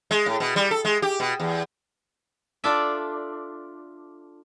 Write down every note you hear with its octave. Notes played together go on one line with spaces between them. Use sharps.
G#3
A2
B2
G3
A4
G#3
G4
B2
E2
D4 F4 A4 D5 E5